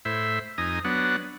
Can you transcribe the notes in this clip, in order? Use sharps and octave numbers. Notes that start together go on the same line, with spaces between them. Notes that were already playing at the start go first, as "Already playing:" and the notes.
A2 E4 C5 E5
F2 D#4 G#5 A#5 D#6
F#3 B3 D4 F#5